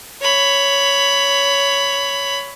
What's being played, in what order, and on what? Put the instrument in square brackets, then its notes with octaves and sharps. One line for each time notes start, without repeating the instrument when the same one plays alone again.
[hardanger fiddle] C#5 B5